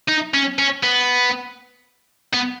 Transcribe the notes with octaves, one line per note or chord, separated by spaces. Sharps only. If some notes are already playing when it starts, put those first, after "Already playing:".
D#4
C#4
C#4
B3
B3